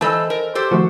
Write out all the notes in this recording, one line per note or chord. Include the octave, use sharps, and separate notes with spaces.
E3 A4 C5 D#5 G#5 A5 B5 E6
A#4
G4 A4 C5
D#3 F3 A3 F#4